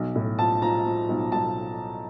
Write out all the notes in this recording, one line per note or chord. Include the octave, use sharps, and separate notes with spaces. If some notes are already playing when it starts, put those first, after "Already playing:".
Already playing: B1
A2
F3 A5
F3 A#5
F3
B1
B1 A5